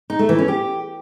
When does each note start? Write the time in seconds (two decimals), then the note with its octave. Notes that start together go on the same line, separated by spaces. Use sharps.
0.10 D#4
0.19 A3
0.29 E3
0.39 C#4
0.48 G4